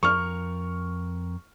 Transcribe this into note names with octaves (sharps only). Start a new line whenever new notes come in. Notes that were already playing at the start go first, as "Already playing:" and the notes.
F2 A#4 C#6 F6